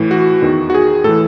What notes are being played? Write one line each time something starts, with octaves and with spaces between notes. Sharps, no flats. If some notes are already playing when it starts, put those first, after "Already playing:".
Already playing: A2 E3
F#4
E2 D#3
F#4
G#4
A2 E3 A4